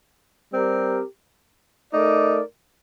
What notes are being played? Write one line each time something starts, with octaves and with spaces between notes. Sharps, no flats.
G3 C4 G4 A#4
A3 D#4 A#4 D5